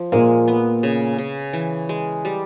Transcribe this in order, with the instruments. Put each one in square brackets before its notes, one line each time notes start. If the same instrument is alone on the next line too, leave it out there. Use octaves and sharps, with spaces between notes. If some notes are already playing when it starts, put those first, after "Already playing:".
Already playing: [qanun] F3
[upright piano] A#2 A#3 [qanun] G#3
[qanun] B3
C#3
C#3
E3
G#3
G3